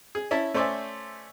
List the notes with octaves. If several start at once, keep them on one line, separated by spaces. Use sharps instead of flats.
G#4
C#4 E4 E5 A5
A3 C#4 C5 D5 E5 G#5